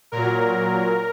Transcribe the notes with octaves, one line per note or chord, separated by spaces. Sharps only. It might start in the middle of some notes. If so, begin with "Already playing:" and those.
A#2 F#3 A#4